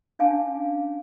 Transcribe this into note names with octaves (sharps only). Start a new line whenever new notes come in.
C#4 D4 F5 G#5 A5 D6